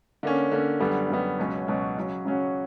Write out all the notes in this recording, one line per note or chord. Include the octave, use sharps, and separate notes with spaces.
D3 A#3 C#4
D3 A#3 C#4
F#2 D3 G3 B3
F#2 D3 G3 B3
C#2 B2 F#3 C#4
C#2 B2 F#3 C#4
C#3 F#3 C#4 F#4
C#3 F#3 C#4 F#4